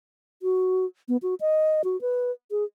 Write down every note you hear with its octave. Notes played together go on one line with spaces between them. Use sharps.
F#4
B3
F#4
D#5
F#4
B4
G#4